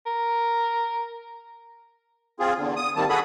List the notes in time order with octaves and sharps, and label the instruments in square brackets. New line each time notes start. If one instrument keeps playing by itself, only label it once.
[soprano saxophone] A#4
[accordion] C4 F4 G#4
E2 D3
D#6
D#3 G3 A#3 C4 A5
F#4 G#4 A4 B5 D#6